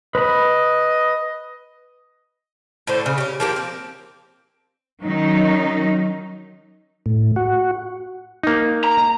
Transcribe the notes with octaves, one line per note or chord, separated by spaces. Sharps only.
B4 D#5 B5
A2 D3 C5
C#3
G4 C#5
F3 A#3 G4
C4
D#3 F#3 C#4 D#4
A2
F#4
A#3 D#4
A#5